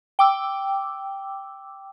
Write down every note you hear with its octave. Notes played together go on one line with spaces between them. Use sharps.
G5 D6 E6